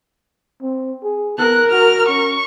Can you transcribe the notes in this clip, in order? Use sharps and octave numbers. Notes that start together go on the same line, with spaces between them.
C4
G#4
B3 A#4 F#6
F#4 F6
C#4 C#6